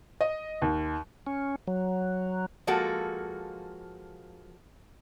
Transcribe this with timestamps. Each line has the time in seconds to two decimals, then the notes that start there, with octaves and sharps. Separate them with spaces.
0.21 D#5
0.62 D#2
1.27 C#4
1.67 F#3
2.67 F3 G#3 A#3 F#4 A4